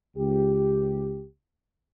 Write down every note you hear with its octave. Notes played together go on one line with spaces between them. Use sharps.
C#2 G4